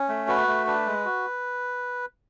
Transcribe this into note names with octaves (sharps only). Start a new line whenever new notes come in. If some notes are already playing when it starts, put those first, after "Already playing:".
Already playing: C#4
A3
F#4 B4
A3
D4 B4
G#3
F#4